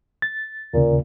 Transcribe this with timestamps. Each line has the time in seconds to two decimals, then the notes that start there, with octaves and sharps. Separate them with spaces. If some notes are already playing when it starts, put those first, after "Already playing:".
0.22 A6
0.74 D#2 A#2 C#3